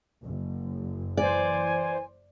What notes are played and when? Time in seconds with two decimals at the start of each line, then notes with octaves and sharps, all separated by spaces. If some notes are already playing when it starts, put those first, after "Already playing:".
0.24 F#1
1.17 E3 C5 D5 G#5